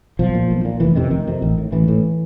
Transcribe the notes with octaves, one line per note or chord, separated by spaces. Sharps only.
B1 F3
A#2
B1
A#2
F1 E3
F2 C3 D#3
F1 D#3
F2 C3
A1
A2
A1 E3
A2